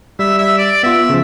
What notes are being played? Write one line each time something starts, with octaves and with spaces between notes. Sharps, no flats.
G3 E5
E5
D5
B3 F4 E5
C#3 F3